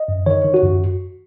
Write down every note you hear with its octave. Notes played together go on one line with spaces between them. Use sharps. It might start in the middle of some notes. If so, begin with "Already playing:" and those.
Already playing: D#5
F#2
D#3 C#5
D#3
F#4
F#2